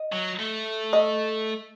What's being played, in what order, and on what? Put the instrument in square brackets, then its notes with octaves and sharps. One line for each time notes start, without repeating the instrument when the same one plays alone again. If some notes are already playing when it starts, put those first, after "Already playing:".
Already playing: [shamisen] D#5
[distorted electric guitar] F#3
A3
[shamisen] D#5